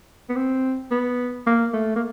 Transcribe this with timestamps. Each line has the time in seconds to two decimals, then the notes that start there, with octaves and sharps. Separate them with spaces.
0.29 B3
0.36 C4
0.91 B3
1.47 A#3
1.74 A3
1.96 A#3